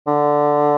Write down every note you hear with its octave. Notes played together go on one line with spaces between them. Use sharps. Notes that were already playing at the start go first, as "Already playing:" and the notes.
D3